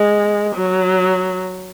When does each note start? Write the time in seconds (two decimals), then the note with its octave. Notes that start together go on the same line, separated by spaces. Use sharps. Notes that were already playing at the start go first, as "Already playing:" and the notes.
Already playing: G#3
0.55 F#3